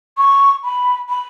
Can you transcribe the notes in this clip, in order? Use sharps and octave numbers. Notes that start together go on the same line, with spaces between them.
C#6
B5
B5